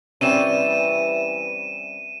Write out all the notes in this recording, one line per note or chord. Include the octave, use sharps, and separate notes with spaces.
E3 G3 C4 C#4 D#7 E7